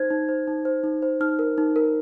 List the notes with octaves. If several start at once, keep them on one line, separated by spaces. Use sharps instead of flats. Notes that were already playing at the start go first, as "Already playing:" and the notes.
Already playing: D#4 C5 G#6
D#4
C5
D#4
C5
D#4
C5
D#4 F6
A#4
D#4
A#4